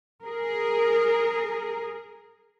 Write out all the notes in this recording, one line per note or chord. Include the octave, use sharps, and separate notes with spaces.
G#4 A#4